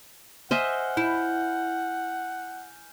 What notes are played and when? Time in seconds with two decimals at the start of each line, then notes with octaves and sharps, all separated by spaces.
0.51 C5 D#5 E5 F#5 G#5 F6 G7
0.97 E4 G6